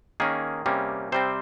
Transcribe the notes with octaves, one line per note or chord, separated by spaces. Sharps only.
D#3 A#3 C#4 G#4
C3 G3 A#3 C#4
C3 G3 C4 C5